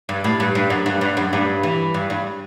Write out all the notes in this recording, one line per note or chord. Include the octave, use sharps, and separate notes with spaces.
G2
A2
G2
G2
F#2
G2
G2
F#2
G2
E3
G2
G2